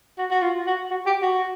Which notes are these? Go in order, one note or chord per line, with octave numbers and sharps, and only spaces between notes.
F#4
F#4
F4
F#4
F#4
G4
F#4